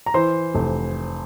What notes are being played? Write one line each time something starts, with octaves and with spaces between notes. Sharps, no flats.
A#5
E3 C5 C6
F1